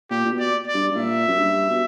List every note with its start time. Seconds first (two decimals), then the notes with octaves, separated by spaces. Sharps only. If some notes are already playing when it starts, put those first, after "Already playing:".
0.11 A#2 G4
0.25 A#2
0.32 B2
0.39 D5
0.67 D5
0.75 G2
0.91 G2
0.95 A#2 E5
1.28 F#2
1.39 G2
1.70 B2